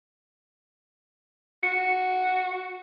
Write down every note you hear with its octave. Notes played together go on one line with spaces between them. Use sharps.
F#4 C#7